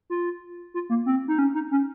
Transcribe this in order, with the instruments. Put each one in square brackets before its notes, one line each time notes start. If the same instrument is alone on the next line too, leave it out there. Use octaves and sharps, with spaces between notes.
[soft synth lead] F4
F4
A#3
C4
D#4
C#4
D#4
C#4